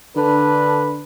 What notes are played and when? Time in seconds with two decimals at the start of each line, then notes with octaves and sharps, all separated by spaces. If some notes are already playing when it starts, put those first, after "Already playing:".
0.16 D3 D4 A4 B4